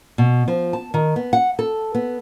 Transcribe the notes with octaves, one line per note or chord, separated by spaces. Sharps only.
B2
F3
A5
D#3
B3
F#5
A4
B3